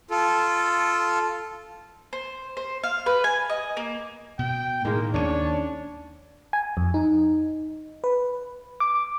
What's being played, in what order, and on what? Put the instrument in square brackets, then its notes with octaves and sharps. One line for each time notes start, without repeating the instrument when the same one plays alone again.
[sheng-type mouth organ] F4 A4
[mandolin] C5
C5
F5
B4
G#5
D#5
A#3
[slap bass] B2 [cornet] G5
[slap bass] A2 [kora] D#3 G#3 [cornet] A#3
[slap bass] D#2 A#3 C#4 [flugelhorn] D4 [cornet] C#5
[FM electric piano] G#5
F2
D#4
B4
D6